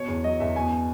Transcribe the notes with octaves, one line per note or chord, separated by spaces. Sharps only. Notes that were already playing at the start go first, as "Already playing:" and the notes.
Already playing: B2 C#5
E2
F#3 D#5
E2 E5
B2 G#5